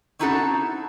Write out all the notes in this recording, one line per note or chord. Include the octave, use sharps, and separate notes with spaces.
C4 C#4 D#4 E4 F#4 A4